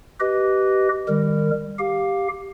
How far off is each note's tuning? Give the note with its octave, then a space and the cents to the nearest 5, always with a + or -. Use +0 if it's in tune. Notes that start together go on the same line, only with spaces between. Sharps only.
G4 -25 B4 +0 D#5 +0
D#3 -15 G3 +35 A#4 -20
G4 +0 F5 +15